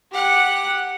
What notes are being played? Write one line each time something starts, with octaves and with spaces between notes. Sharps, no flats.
G4 F#5